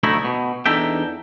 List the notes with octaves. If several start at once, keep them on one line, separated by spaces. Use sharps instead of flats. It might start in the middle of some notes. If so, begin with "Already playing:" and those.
D2 A3 D#4 E4
B2
E2 D4 D#4 A4 E5 G5